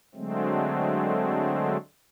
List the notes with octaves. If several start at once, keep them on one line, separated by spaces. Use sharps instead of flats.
D3 F#3 G#3 A3 C4